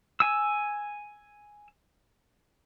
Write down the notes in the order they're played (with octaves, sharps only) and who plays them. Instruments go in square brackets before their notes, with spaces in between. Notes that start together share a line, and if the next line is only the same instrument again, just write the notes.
[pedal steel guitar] G#5 E6